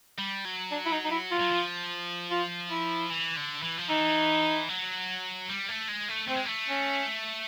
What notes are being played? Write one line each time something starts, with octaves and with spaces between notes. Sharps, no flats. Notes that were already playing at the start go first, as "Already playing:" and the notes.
G3
F#3
D4
E4
D#4
D#4
E4
F4
F#3
F3
F4
E4
E3
D3
E3
F3
E3 D#4
F#3
G3
A3
G#3
A3
A3 C4
G#3
A3
C#4